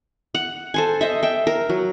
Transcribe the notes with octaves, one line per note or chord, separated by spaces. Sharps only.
F#5
A4 C5 G#5
C5 D#5 E5
E5 G5
A#4
F#3